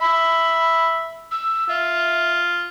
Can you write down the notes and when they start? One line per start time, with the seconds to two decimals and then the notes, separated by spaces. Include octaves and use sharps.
0.01 E5 B5
1.31 E6
1.69 F4 E5